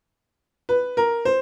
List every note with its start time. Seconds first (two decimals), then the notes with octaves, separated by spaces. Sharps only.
0.69 B4
0.97 A#4
1.25 C5